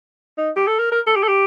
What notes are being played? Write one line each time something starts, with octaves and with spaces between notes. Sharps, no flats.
D#4
G4
A4
A#4
A#4
A4
G4
A4
G4